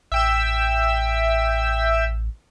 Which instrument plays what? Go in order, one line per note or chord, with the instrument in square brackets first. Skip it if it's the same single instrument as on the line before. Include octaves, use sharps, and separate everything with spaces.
[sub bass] A1 [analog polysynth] E5 G5 E6